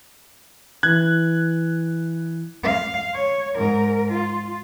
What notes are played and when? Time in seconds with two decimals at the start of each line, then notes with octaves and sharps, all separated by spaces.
0.83 E3 F#6 G#6
2.63 F5
3.14 C#5
3.56 G#2 A#4
4.12 F4